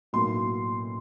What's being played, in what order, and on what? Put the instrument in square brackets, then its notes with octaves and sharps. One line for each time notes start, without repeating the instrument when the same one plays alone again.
[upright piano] B1 A2 F#3 A#3 C6